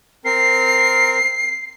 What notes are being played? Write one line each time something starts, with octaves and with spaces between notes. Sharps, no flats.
C4 A#4 C7